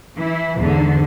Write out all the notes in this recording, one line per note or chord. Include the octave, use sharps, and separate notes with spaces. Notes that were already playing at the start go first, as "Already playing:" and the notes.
E3 E4
E2 G#2 D3